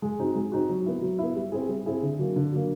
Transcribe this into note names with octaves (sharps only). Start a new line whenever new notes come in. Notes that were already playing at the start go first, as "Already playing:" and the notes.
G#3
C4 D#4 F#4
G#3
C4 D#4 F#4
F#3
B3 E4
F#3
B3 E4
G3
C4 E4 G#4
G3
C4 E4 G#4
D3
F#3 A#3
D3
F#3 A#3